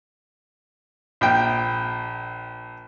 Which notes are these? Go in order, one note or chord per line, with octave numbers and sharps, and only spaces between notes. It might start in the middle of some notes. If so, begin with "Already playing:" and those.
A#1 G5